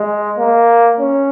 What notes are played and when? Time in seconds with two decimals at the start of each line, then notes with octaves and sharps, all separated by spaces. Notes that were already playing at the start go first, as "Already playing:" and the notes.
Already playing: G#3
0.38 A#3
0.99 C#4